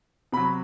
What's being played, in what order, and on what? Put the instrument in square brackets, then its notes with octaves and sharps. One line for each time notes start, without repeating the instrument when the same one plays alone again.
[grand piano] C3 F#3 B5